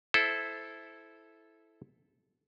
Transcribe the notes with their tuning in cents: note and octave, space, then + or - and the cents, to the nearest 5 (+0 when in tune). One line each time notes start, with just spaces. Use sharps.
E4 +0 A4 -15 C5 +0